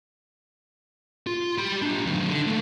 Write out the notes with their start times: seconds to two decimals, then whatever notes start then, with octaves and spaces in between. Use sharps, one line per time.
1.27 F4
1.58 G4 B5
1.82 D4 F4
2.06 F#2 D#3
2.28 D3
2.46 A3 A#3